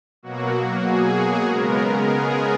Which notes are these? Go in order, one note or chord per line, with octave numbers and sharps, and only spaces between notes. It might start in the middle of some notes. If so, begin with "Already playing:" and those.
B2 F#3 A#3 F#4
G#4
C#3 G#3 B3 A#4
G#4